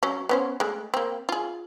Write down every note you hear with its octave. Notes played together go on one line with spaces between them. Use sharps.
F#3 C#4
B3 C#4 C5
G#3 A3
A#3 C4
F4 G#4